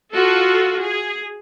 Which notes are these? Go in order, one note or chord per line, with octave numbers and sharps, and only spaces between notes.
F4 F#4 A4
G#4